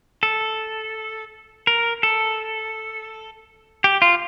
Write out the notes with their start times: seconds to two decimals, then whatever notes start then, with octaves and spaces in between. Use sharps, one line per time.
0.23 A4
1.67 A#4
2.03 A4
3.84 G4
4.02 F4